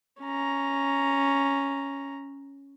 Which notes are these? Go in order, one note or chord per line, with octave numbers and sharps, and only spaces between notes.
C#4 A#5